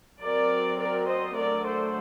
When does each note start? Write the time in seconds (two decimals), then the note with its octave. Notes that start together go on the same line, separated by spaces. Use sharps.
0.21 F#3 C4 A#4 D5
0.79 A#4 D5
1.08 C5 D#5
1.36 D3 F#3 A3 A#4 D5
1.65 A4 C5